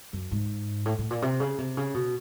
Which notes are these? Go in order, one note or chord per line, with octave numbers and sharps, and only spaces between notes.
F#2
G#2
A2
A2
A#2
C3
C#3
C3
C#3
B2